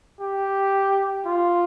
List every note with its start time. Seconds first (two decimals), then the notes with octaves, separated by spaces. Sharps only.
0.20 G4
1.25 F4